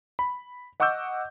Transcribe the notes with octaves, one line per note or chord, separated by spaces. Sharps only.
B5
D#5 F#5 C#6 D6 E6 G6